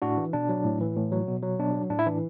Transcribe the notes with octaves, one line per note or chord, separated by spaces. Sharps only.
A2 D4 F#4
E3
B2 D4
F#3
A2
E3
A2
F#3
B2
F#3
B2 D4
F#3
A2 D4
E4
E3 D4